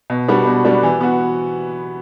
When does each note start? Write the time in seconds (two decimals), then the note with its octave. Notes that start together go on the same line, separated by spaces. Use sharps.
0.10 B2
0.28 G3 B3 D4 F#4
0.46 B2
0.65 G3 B3 D4 F#4
0.83 E3
1.01 B3 F#4